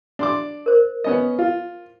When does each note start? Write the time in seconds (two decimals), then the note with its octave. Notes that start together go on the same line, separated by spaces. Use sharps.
0.19 D4 C6 D6
0.66 A#4 C5
1.04 B3 C#4 D#5
1.39 F4